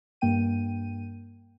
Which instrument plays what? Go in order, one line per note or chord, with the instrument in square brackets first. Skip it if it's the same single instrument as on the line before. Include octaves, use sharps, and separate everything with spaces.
[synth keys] G2 A#3 G5 D#7